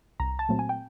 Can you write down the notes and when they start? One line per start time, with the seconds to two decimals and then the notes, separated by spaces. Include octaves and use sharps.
0.20 C2 A#5
0.39 A5
0.49 A#2 F#3 A3 C4
0.59 G#5
0.69 G5